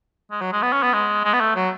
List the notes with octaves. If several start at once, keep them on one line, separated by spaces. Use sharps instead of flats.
G#3
F#3
G#3
B3
C#4
B3
G#3
G#3
B3
A3
F#3